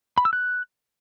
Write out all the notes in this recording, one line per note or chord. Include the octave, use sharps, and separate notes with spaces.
B5
E6
F#6